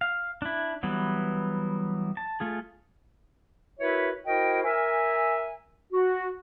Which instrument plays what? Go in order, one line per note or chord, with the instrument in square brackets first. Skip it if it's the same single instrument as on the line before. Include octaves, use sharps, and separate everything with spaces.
[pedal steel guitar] F5
D4 E4
E3 F#3 G3 B3
A5
A3 F4 G#4
[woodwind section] E4 F#4 A#4 B4 C#5 E5
E4 F#4 A#4 C5 D#5 G5
A#4 E5 G#5
F#4